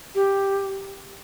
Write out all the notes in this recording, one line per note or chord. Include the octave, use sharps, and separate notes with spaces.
G4